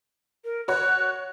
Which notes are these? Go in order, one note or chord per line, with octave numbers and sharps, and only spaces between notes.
A#4
F#4 C#5 F#6